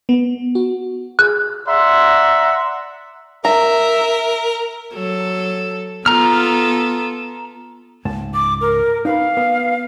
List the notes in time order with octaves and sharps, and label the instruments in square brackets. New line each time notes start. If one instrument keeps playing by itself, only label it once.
[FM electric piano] B3
F#4
[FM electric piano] G#4 [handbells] F#6
[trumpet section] D5 E5 F#5 A#5 C6
[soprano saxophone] A#4 [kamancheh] E5 [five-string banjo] A#5
[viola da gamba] F#3 A4
[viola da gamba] B3 F4 A4 [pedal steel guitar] A#5 F6
[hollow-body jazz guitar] C#2 G#2 A5
[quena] D6
A#4
[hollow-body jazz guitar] D#4 B4 B5 [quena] F5
[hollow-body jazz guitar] B3